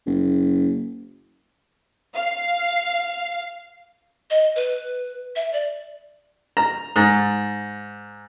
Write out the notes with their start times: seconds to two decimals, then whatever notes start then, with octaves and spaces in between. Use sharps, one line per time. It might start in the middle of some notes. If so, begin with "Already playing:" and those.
0.06 F#1
2.15 F5
4.30 D#5
4.56 B4
5.36 E5
5.53 D5
6.57 A#5
6.96 G#2